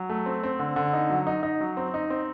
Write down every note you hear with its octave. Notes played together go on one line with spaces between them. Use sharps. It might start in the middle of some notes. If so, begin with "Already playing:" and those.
Already playing: F#3
A3
C4
C4
D3
D3
D#4
F#3
D#4
D#4
F#3
C4
D#4
C4